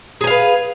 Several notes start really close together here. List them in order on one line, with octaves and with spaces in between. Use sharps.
G#4 G#5 F5 B4